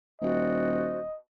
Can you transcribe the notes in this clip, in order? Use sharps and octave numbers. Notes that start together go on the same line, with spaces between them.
D#1 F#4 C5 D5 D#5